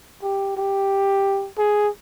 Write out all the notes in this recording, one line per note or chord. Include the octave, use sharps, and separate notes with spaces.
G4
G4
G#4